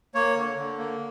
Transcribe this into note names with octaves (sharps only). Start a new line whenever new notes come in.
A#3 C#5
D3
D3
A#3